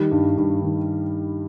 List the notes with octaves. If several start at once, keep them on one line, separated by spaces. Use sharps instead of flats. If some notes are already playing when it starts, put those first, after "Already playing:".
Already playing: D#3 G3
G2
G2
D#3